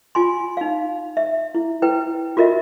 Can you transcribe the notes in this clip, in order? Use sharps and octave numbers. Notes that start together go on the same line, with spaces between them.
F4 G#5 C6
D#4 F5
E5
E4
E4 B4 G5
F4 F#4 A#4 D#5 E5